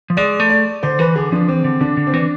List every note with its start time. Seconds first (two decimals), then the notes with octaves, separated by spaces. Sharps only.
0.10 F3
0.17 G#3 D5
0.40 A3
0.50 D5
0.83 D3 C5
0.99 E3 B4
1.15 D3 G#4
1.32 F3 D4
1.48 E3 C4
1.64 D3
1.81 D3 D4
1.97 D3
2.07 C4
2.14 E3 D4